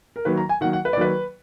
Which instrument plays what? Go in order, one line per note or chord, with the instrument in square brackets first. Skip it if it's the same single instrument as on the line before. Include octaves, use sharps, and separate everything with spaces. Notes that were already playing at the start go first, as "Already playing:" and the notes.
[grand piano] A#4
D#3 F#3 A#3 B4
A#5
G#5
D#3 F#3 A#3 F#5
F#5
B4
D5
D#3 F#3 A#3 B4